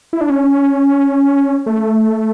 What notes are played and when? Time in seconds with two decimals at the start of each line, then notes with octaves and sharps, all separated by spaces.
0.13 E4
0.21 D4
0.30 C#4
1.66 A3